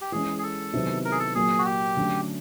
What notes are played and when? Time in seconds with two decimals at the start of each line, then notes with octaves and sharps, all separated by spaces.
0.01 G4
0.12 E3 G#3 C#4 G#4
0.39 G#4
0.43 A4
0.73 C3 D#3 F#3 B3 E4
1.05 A#4
1.12 G#4
1.19 A4
1.35 A#2 F#3 A#3 G#4
1.59 F#4
1.65 G4
1.97 D3 F#3 A3 C#4